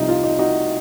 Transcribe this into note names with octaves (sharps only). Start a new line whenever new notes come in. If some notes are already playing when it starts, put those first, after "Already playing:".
Already playing: C2 C3 F3 D#4
F4
D#4
D#4 F#4